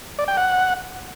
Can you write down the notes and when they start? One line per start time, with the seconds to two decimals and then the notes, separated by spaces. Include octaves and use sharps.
0.19 D5
0.28 G5
0.37 F#5